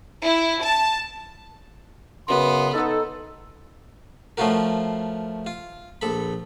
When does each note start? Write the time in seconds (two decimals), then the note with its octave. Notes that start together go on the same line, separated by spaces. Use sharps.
0.25 E4
0.63 A5
2.28 F#2 C#3 B3 C6
2.73 D#4 A4
4.37 F3 A3 C#4 F4 F#4 A#4
5.46 F4
6.01 A#1 A4 B5